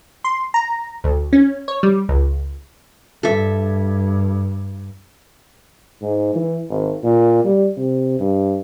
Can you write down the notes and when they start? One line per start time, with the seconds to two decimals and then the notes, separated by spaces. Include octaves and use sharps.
0.24 C6
0.54 A#5
1.04 D2
1.33 C#4
1.68 C#5
1.83 G3
2.09 C#2
3.23 G2 A4 E5
6.02 G#2
6.35 E3
6.70 G#1
7.03 A#2
7.45 G3
7.77 C3
8.19 G2